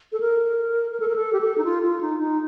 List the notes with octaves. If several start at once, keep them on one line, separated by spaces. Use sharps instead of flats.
A4
A#4
A#4
A4
A#4
A4
G4
A4
D#4
F4
F4
D#4
D#4